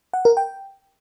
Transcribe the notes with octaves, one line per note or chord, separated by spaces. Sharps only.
F#5
A#4
G5